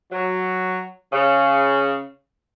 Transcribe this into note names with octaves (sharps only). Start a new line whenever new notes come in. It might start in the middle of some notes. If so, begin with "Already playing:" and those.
F#3
C#3